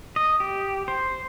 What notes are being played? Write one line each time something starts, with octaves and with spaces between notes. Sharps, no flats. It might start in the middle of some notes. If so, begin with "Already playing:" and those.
D#5
G4
C5